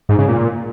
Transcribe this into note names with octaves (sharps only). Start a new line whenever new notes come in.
G#2
C#3
A#2